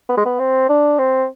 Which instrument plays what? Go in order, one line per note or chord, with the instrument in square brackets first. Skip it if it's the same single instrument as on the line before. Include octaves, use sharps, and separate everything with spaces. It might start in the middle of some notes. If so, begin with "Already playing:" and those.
[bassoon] B3
G#3
B3
C4
D4
C4